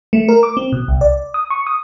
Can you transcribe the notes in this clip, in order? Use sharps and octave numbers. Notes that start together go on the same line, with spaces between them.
A3
A#4
D6
C4
B2
C2
D5
D#6
C#6
D#6